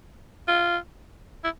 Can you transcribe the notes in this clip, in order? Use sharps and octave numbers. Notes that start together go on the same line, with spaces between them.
F4
E4